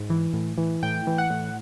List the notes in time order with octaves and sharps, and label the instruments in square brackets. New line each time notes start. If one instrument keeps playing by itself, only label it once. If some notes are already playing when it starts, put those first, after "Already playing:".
Already playing: [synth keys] G#2
E3
A2
E3
A2 G5
E3
F#5
A2